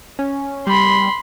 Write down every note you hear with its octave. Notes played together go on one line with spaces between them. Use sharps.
C#4
G3 B5 C6